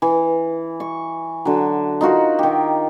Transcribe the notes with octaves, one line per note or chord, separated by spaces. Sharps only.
E3
C#6
D3 F#3
D#4 F4 F#4 A#4
D#3 G4